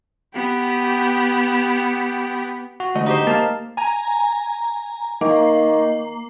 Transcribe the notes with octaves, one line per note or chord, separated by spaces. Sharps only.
B3 G4
F#4
D2 A3 D#5
D#4 G4 C5
A#3 F5 A5
G#5 A#5
D#3 A#3